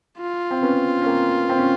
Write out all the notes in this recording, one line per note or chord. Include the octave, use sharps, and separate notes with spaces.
F4
C4
B3 C#4
C#4
A#3 C4
C4
C#4